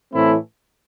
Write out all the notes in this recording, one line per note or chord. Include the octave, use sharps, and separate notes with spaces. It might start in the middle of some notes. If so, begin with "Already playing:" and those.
A2 E3 A3 C4 E4